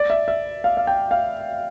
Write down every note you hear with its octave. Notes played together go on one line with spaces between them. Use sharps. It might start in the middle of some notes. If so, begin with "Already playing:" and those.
Already playing: D5
E5
E5
F5
F5
G5
F5